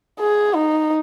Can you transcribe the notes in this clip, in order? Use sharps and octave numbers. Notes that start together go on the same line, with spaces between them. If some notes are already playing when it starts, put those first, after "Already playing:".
G#4
D#4